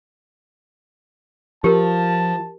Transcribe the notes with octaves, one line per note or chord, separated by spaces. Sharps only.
F3 G4 A#4 A5